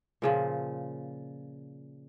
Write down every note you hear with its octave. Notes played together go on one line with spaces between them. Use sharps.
A#2 C#3 F3